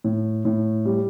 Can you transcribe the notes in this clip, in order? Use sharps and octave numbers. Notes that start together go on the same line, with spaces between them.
A2
A2
G3